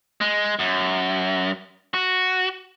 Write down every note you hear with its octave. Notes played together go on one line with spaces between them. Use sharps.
G#3
F#2
F#4